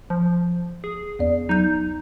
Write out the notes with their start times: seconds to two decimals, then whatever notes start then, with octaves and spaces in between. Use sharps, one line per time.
0.10 F3
0.84 G#4
1.19 E2 B3 D5
1.49 F#3 D#4 G6